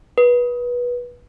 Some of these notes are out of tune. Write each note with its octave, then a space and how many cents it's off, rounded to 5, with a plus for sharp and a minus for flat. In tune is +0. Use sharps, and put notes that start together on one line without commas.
B4 -20